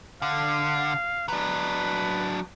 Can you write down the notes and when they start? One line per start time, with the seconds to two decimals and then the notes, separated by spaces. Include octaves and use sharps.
0.22 D3 F5
1.28 F#3 D4 B4